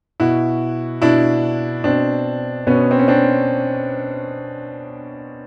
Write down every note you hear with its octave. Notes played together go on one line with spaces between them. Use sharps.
B2 E4 F#4
B2 D4 E4
B2 C4 D4
B2 B3 C#4
C4
C#4
C4 D4